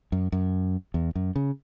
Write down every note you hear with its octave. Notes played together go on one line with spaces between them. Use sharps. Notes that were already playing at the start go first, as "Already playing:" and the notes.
F#2
F#2
E2
F#2
C#3